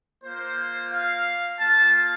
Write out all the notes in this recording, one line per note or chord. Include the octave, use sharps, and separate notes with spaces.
A#3 F4 C5
F5
A#3 F4 A5